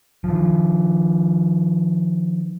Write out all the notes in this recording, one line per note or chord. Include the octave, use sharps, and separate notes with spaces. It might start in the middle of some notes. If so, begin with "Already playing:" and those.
D#3 F3